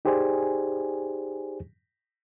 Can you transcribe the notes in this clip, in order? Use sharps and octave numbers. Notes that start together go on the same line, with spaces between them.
D#4 G4 G#4 C5 D5 G#5